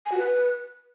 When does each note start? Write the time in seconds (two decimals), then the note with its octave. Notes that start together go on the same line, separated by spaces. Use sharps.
0.06 G#5
0.12 F#4
0.18 B4